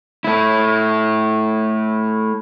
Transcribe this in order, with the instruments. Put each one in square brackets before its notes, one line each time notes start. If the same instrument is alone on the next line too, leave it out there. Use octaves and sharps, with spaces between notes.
[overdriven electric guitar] A3 E4